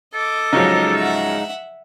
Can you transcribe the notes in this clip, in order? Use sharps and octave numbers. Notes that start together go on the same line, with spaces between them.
A4 D#5 D6
C#3 F3 F#3 G#3 D#4
E5 F#5